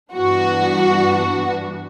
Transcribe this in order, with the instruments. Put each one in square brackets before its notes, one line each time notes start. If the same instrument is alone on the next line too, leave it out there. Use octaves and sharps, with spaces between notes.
[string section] G2 E3 B3 D4 F#4